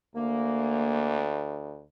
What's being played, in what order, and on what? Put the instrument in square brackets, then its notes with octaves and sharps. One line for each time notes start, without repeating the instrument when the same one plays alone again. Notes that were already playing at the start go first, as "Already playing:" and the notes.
[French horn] D2 [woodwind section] A#3